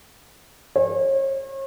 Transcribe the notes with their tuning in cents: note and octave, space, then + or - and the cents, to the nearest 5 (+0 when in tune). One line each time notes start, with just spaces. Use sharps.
C#5 -40